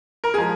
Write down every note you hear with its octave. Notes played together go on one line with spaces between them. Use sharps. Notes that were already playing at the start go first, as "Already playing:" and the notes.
A#4
F3 G#3 G#4